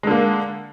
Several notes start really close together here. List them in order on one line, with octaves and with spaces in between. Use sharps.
G#3 D3 A#3